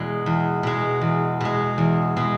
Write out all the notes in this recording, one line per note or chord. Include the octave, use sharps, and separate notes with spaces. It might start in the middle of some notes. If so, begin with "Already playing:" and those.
Already playing: E2 B2 G#3
E2
B2 G#3
E2
B2 G#3
E2
B2 G#3